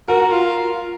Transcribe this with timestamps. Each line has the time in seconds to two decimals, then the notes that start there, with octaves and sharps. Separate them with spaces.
0.08 F#4 A#4
0.31 F4